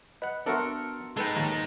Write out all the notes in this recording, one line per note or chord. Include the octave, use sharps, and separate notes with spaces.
B4 D#5 F#5
B3 D4 F#4 A4 A#4 E5 C6
G#3 D#4 A4 B4 G5
D#2 A#2